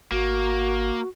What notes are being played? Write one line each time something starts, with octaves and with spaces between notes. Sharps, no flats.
G#1 A#3 F#4